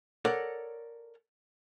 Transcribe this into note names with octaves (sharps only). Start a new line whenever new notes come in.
A4 A#4 C#5 D5 F#5